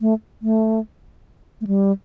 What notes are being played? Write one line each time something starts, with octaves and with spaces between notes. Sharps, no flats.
A3
A3
A3
G3